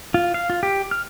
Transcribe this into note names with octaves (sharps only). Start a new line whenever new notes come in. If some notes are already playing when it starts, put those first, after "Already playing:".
F4
F5
F4
G4
F6